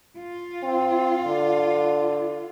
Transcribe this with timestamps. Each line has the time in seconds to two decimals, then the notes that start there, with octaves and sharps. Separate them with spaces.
0.18 F4
0.63 C4
1.26 D3